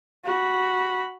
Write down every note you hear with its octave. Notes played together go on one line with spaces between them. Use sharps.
F#4 B5